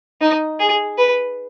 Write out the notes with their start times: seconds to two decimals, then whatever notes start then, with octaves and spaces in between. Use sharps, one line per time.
0.21 D#4
0.59 G#4
0.98 B4